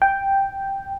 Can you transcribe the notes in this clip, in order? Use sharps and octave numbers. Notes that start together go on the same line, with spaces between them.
G5